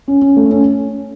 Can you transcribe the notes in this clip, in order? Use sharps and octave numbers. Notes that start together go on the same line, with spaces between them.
C#4
C#4
A3
C#4